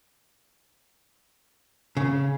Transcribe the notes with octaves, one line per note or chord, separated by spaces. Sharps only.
C#3